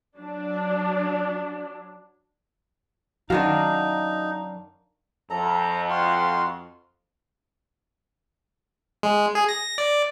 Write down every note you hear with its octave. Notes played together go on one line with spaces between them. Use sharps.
F#3 D4
F#2 D#3 D4 D#4 F#4 F5 A#5
F2 A4 A#5
F4 F#4 C6
G#3
G#4
A#6
D5